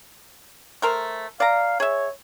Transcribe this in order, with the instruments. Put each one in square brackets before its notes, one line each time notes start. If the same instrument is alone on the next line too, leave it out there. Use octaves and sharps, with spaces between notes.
[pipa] A3 A#4 C5
[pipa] D5 A#5 [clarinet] F5
[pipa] G#4 E5 [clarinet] C#5